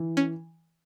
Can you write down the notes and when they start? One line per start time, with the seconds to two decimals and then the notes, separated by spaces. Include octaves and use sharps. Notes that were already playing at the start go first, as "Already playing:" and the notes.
Already playing: E3
0.17 C#4